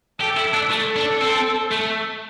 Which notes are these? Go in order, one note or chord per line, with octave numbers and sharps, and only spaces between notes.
G4 A4
E4
D4
A3 A4
D4
C4
A3